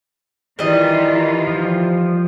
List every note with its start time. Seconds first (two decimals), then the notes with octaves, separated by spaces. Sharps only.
0.59 D#3 E3 G3 F4 D#5
1.47 F3